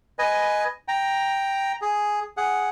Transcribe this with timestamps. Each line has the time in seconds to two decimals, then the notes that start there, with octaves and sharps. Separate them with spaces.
0.19 B4 D#5 G#5
0.88 G5 A#5
1.82 G#4
2.37 G#4 F#5